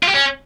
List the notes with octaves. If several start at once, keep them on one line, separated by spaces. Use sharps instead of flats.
F4
G4
C#4